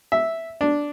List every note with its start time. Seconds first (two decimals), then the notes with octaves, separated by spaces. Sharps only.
0.12 E5
0.61 D4